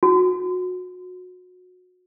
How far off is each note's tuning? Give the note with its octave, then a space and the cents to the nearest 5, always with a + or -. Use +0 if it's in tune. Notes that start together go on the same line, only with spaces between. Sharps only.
F#4 -25